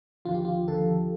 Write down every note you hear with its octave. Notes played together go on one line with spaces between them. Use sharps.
D#2 D3 F3 F4
G4
F4
D#2 D3 F3 A4